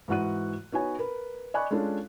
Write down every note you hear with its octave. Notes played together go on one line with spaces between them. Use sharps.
G#2 E3 F#4 F#5 F#6 D#7
B3 D#4 F#4 B4 C#5 G#5
A#4 B4
D5 D#5 G#5 B5 C#6 F#6
G#3 C#4 D4 F4 A4